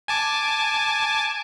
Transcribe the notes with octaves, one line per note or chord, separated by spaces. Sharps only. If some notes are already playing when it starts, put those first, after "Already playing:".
G#5 A5 D6